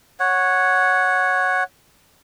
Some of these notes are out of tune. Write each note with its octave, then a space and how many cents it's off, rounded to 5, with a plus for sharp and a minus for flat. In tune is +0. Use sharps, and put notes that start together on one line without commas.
C#5 +0 F#5 -5